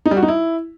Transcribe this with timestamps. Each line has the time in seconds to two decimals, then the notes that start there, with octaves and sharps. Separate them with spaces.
0.06 D#4
0.11 G3
0.17 F#4
0.23 D#4
0.28 E4